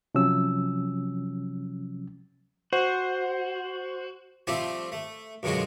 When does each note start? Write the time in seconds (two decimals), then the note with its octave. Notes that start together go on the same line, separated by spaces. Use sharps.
0.15 C3 F3 F#3 C#4 E6
2.73 F#4 C5
4.47 F3 G3 A3 C4 F4 G4
4.92 A3
5.43 F#2 B2 D3 G#3 F4 F#4